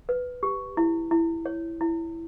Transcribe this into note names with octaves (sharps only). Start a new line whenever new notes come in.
B4
G4
E4
E4
C#5
E4